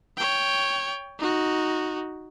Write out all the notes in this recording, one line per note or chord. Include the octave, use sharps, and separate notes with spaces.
C#5 G5
D#4 F#4